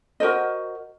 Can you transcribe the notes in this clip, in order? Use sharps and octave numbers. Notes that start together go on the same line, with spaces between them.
F#4 A#4 C5 D#5